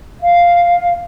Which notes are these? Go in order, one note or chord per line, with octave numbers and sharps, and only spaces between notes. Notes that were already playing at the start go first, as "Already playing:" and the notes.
F5